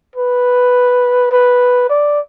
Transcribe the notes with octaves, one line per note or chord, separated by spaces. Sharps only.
B4
B4
D5